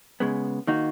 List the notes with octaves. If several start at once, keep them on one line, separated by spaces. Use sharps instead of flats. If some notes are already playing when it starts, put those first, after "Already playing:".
C#3 G#3 B3
D#3 A#3 D#4 F#4